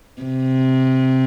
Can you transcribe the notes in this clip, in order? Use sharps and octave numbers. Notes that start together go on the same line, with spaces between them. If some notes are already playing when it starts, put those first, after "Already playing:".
C3